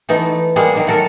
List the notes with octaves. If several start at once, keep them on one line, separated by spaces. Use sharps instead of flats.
E3 A3 B3 D#4
G3 G#3 A#3 G#4 F#5
D#3 F#3
A3 F#4 A4 A#4